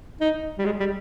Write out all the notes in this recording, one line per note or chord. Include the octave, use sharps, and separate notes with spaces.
D#4
G3
G#3
G3